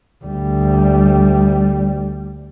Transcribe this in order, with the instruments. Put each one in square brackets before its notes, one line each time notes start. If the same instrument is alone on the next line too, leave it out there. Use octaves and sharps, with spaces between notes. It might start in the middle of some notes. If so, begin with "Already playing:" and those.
[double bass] D2 G3